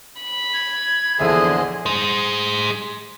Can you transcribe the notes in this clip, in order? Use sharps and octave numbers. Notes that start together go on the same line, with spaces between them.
B5
G#6
A#1 E2 D3 G#4 C5 D#5 E5
G#4 C5